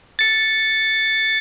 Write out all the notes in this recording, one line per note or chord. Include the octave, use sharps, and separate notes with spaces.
A6 C#7